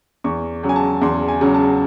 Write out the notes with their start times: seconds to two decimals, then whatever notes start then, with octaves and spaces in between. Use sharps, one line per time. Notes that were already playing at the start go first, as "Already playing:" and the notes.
0.24 E2 C#6
0.63 C#3 F#3
0.69 G#5
0.76 A5
1.02 E2 C6
1.28 G#5
1.41 C#3 F#3
1.54 A5